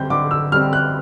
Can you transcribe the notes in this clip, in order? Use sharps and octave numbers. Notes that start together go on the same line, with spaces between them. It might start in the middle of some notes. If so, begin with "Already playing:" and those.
Already playing: D3 G3 C4 G6
D3 D6
E6
G3 C4 F6
F#6